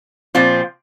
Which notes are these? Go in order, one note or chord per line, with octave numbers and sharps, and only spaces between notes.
A#2 F3 C4 F4